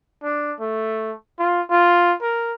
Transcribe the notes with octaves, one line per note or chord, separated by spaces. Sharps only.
D4
A3
F4
F4
A#4